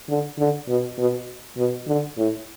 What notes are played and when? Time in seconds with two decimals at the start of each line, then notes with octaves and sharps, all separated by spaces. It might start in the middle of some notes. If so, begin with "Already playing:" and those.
0.09 D3
0.39 D3
0.68 B2
0.98 B2
1.57 B2
1.87 D3
2.18 A2